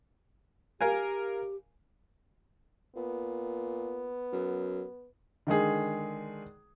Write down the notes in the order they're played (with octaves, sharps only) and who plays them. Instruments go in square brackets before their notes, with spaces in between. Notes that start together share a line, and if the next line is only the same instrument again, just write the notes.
[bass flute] G4 [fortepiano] A#4 F5 G#5
[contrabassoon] A#2 [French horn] B3
[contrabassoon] F#2
[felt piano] D3 D#3 G#3 G#4